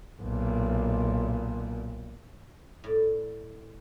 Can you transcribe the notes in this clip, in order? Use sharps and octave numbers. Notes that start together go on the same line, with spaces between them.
B1 A#2
A2 D5